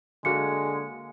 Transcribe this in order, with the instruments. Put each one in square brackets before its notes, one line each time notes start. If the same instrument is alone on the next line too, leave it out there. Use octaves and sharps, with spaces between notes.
[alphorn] D3 [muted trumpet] G#3 [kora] A#3 F#4 [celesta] C#7